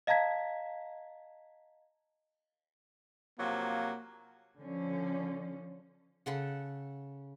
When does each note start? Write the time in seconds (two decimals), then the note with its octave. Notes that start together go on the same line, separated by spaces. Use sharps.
0.07 D#5 F5 A5 A#5 G#6 B6
3.39 C3 F3 F#3 A#3
4.59 D3 F3 C#4
6.26 C#3 A4 F#5